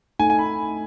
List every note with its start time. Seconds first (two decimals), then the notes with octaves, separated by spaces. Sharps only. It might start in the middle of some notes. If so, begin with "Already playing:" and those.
0.19 A3 D#4 A4 G#5
0.30 G#5
0.39 B5